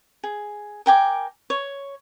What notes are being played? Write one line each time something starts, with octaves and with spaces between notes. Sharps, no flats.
G#4
A#4 G5 G#5 D6
C#5